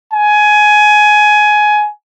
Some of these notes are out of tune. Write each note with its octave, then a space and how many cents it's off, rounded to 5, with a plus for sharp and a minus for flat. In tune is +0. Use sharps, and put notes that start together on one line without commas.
G#5 +15